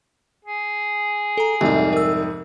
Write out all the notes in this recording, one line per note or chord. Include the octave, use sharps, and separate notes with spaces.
G#4
A4 A#5
C2 F2 G#2 G4 E5
A#4 E6